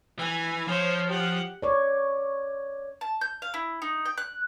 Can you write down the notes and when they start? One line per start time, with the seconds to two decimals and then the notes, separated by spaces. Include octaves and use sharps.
0.19 E3 G#5
0.68 F3 C5 C#5
1.09 G4 F#5
1.62 C#5 D5
3.01 A5
3.21 G6
3.42 F5
3.54 E4
3.82 D#4
4.06 G5
4.18 F#6